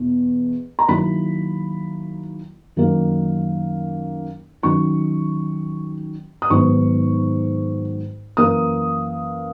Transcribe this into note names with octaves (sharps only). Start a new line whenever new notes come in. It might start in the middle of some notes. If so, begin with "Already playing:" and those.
Already playing: E2 B2
A#5
D#3 F#3 A#3 E4 B5
F#2 D#3 F#3 A#3 D#4
D#3 F#3 C#4 C#6
D#6
G#2 D#3 F#3 B3 D#4 C#6
F#2 E3 A#3 D#6